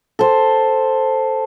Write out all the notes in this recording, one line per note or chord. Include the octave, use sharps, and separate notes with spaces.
A4 C5 G5